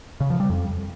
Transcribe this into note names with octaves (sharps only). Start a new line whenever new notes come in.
C#3
F3
G3
F2